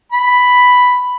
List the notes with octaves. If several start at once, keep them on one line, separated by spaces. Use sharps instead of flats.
B5